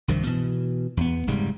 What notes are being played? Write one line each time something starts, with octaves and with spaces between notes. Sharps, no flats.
C2 G2 D#3 F3
B2 E3
E2 B3
F1 G#2 C#3 G3